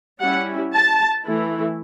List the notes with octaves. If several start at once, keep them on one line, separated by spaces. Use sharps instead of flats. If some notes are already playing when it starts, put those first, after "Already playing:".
G3 C#4 E4 F#5
A5
E3 A3 E4